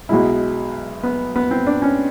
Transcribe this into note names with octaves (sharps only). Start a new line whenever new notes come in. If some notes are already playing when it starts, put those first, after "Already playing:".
B1 B2 G#3 E4
B3
B3
C4
D4
C#4